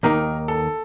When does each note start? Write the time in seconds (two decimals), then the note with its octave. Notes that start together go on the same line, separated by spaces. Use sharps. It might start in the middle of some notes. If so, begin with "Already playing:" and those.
0.03 D#2 D#3 A#3 D#4 A#4
0.48 A4